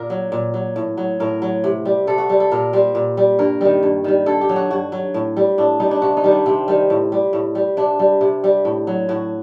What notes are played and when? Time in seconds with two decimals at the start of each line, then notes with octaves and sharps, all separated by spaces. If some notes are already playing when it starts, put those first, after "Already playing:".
Already playing: A#2 A#4
0.10 F#3
0.32 A#2
0.54 F#3
0.76 A2
0.97 F#3
1.20 A2 A#4
1.42 F#3
1.64 C3
1.85 G3
2.07 C3 A4
2.18 F#4
2.29 G3
2.40 A4
2.51 A#2 A#4
2.73 G3 C5
2.95 A#2
3.17 G3
3.39 G2 A#4
3.61 D#3 G3
3.83 G2
4.04 D#3 G3
4.26 G2 A4
4.41 G4
4.49 F#3
4.56 F#4
4.71 G2 F#4
4.92 F#3
5.14 A2
5.37 G3
5.58 A2 D4
5.80 G3 D#4
5.91 D4
6.02 C3 F#4
6.17 D#4
6.24 D#3 G3
6.31 D4
6.46 C3 C4
6.68 D#3 G3
6.90 A2
7.12 G3
7.33 A2
7.55 G3
7.77 C3 D4
7.99 G3
8.21 C3
8.44 G3
8.65 A2
8.87 F#3
9.09 A2 F#4